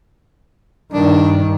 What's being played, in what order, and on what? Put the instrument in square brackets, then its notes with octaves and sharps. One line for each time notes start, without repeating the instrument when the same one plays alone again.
[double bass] G2 D#3 [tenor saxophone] D4